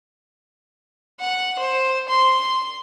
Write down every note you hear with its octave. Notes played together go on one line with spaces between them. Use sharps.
F#5
C5
C6